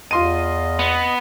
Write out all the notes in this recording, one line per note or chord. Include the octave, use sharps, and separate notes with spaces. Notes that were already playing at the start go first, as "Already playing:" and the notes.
E2 F4 D#5 C6 D#7
B3